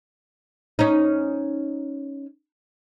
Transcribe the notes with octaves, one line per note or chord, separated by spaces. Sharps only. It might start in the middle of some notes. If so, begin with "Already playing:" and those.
C#4 D#4